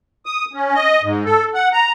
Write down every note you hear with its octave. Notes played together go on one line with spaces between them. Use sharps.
D#6
C#4
D#5
G#2
A4
F#5
A#5